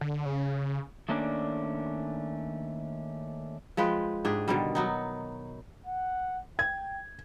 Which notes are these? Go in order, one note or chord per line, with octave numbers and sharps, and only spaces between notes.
D3
C#3
D#3 A3 A#3 C#4 D4 D5
F3 G#3 B4 G5
G#2 D4 G4 G#4
B2 D3 D#3 G3
F#3 B3 D#4
F#5
G5 G#6